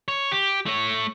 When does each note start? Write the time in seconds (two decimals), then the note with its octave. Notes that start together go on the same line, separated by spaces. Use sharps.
0.08 C#5
0.32 G4
0.66 A3 C#5